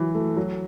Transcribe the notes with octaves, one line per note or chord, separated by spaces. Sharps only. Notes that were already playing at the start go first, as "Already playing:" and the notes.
Already playing: E3 F#3
A3
F#3